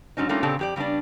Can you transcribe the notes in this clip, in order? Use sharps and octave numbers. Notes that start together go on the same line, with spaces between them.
G#2 F#3 C#4 D#4
G3 A3 A#3 C#4 D#4 F4
A#2 C#3 C4 D4 G4 A4
F2 G4 D5
C#3 G3 B3 D4 D5